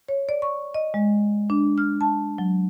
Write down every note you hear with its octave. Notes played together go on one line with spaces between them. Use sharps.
C#5
D5
C#6
D#5
G#3
D4
F6
A5
F#3